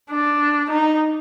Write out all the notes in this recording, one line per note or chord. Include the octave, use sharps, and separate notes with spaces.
D4
D#4